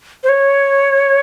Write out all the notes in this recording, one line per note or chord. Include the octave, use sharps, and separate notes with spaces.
C5
C#5